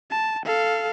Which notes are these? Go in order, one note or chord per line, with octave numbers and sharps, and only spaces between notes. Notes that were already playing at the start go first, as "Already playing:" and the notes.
A5
A4 F5